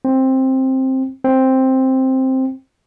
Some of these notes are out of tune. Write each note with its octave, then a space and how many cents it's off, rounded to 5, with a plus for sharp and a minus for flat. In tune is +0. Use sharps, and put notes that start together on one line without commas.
C4 +10
C4 +5